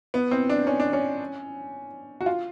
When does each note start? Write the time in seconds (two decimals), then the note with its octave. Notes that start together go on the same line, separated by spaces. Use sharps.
0.14 B3
0.31 C4
0.49 D4
0.67 C#4
0.80 D4
0.93 C#4
2.21 F#4
2.26 F4